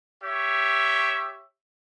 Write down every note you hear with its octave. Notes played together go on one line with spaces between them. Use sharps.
G4 C#5 E5